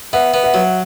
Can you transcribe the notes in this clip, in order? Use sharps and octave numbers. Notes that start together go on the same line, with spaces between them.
B3 E5 F#5
B3
E5 F#5
F#3